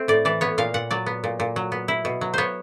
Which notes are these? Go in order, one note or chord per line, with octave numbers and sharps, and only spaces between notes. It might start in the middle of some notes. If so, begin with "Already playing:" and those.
Already playing: A3 C4
A2 D5
E3 D5
B3 C#5
A#2 F5
A#2 F#5
F#3 D5
B3
A#2
A#2
F#3
B3
E4
B2
F#3
B3 C5 C#5